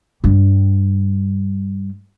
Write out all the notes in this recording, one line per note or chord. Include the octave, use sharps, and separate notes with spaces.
G2 G3